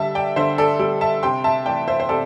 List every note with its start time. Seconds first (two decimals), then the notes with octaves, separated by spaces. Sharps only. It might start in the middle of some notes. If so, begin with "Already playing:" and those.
Already playing: D3 G3 E5 A5
0.15 D5 G5
0.36 D3 C5 E5
0.58 A4 D5
0.79 G3 A4 D5
1.01 E5 A5
1.23 C3 G5 C6
1.44 E5 A5
1.66 E3 A3 D5 G5
1.88 C5 E5
2.00 C5
2.09 C3 A4 D5